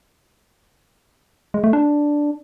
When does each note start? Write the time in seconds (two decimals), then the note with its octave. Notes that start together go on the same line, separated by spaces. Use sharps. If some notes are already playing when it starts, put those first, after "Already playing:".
1.54 G#3
1.64 A3
1.73 D4